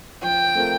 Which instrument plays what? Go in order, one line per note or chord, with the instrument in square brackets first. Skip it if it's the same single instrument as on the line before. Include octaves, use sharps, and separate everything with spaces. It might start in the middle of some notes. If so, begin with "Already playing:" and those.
[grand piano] F3 [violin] G5
[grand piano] A3 C4 F4 A#4